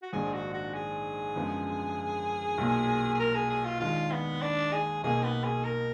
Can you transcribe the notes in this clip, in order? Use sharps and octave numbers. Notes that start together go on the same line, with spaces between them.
F#4
A#1 G#2 D#3 G#3 D4 G#4
F#4
F#4
G#4
F#2 D3 F3 G#3 B3
B1 A#2 F#3 A#3
G#4
A#4
G#4
G#4
F4
D#2 D#3 G#3 D4 F4
B3
D4
G#4
B1 B2 A#3 D#4 G#4
B3
G#4
A#4